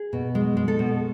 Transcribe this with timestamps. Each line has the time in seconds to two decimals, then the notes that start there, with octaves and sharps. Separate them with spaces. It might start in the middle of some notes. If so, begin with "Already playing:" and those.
Already playing: G#4
0.13 B2
0.35 G#3
0.57 G#3
0.68 A4
0.79 B2